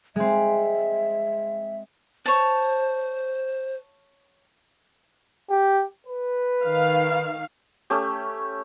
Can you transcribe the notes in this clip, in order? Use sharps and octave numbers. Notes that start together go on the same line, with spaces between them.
G#3 C4 E5
C5 C#5 A5
G4
B4
D#3 F5
A3 C#4 G4